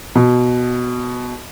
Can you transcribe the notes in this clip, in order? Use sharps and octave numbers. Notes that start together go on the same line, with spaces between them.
B2